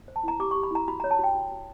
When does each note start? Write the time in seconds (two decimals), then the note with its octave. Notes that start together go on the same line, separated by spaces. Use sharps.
0.08 C5
0.16 A5
0.24 E4 A#5
0.39 G4 D6
0.51 C#6
0.55 G4
0.63 B5
0.71 E4 A#5
0.88 F#4 B5
1.00 A#5
1.04 C#5
1.11 A5
1.19 F#4 G5
1.35 F#4
1.51 F#4